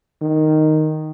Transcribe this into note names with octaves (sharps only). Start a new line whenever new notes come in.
D#3